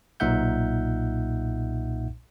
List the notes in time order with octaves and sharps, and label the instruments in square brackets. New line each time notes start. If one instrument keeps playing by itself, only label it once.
[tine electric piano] B1 A#2 D#4 E5 F#5 G6